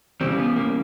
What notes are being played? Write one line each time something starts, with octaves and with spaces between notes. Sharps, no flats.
C#3 E3 G3 C4
B3
A#3